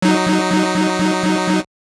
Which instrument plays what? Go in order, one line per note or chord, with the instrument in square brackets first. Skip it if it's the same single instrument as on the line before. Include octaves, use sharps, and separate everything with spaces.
[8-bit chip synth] F#3 D#4